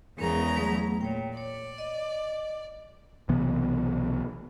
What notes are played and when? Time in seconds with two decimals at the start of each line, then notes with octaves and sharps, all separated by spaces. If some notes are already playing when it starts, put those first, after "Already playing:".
0.18 E2 C#3 G#3 B3 A#4 A#5
0.56 F#3 A3 B3
1.01 A#2 C#5 G5
1.37 C#5 D5
1.78 D#5
3.29 B1 C3 E3 B3